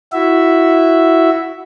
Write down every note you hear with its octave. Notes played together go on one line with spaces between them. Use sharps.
E4 F#4 E5